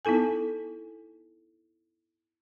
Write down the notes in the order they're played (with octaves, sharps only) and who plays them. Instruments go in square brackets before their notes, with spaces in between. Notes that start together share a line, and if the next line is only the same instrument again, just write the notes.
[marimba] B3 D#4 E4 A4 G#5